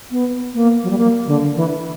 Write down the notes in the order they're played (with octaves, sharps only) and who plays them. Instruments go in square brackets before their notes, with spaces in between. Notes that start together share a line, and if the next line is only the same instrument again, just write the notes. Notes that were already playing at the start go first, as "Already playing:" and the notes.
[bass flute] B3
A#3
F#3
G3
A#3
D3
E3